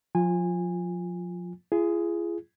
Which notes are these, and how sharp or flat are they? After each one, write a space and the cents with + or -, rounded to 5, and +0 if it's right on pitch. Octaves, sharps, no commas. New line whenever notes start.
F3 +35 F4 +0 G#5 -20
F4 -45 G#4 +0